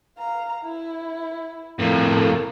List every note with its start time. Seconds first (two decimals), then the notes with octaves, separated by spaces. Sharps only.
0.18 F5 A#5
0.64 E4
1.79 F2 A2 A#3